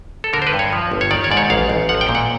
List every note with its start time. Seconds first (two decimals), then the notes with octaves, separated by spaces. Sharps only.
0.24 A4
0.33 D3 A#4
0.42 C5
0.47 B4
0.53 G2
0.59 C#5
0.72 F3
0.92 G1
1.01 C#5
1.11 D#3 D5
1.24 C#5
1.31 G#2 D5
1.37 C#5
1.50 A1 F5
1.69 A1
1.89 F3 F#5
2.01 G5
2.09 A#2
2.15 F#5